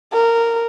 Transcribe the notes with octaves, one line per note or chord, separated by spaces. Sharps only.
A#4